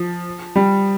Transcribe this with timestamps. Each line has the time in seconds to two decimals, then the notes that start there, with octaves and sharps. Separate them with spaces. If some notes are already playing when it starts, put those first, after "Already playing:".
Already playing: F3
0.56 G3